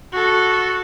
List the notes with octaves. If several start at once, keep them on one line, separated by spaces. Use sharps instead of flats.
F#4 A4